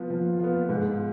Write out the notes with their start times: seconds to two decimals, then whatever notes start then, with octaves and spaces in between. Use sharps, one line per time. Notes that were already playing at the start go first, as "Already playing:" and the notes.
Already playing: F3 B3 F4
0.10 F3
0.39 B3 F4
0.69 G#2